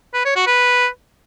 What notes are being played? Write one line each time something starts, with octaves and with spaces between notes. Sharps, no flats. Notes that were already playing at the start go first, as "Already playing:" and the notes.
B4
C#5
F#4
B4